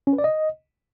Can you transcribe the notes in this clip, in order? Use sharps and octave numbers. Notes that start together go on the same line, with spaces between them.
C#4
B4
D5
D#5